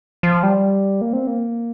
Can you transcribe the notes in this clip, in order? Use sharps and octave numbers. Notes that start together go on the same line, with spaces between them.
F3
G3
A#3
C4
A#3